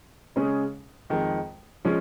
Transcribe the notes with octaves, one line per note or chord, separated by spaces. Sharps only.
C#3 G#3 C#4 G#4
F2 D#3 G#3
F3 G#3 C#4